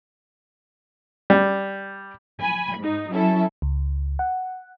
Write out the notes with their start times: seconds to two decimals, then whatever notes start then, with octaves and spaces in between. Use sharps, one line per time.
1.30 G3
2.41 G#5 B5
2.78 G#2 D#4
3.10 F#3 C#4 E4 A4 E5
3.62 C#2
4.19 F#5